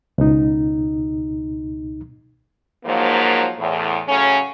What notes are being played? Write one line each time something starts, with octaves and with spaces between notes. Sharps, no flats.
C#2 B2 D#4
G#2 F3 F#3 A#3
E2 A2
A2 C#3 F#3 C#4